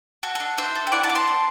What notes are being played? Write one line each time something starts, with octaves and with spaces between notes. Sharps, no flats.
F#4 A4
D4 A4
D4 C5 E5
A4
G5
E4 D5 F#5
F#5 A5
C4 D6
A5 C6
C4